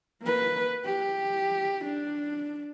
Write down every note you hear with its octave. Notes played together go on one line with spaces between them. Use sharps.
A#3 B4
G4
D4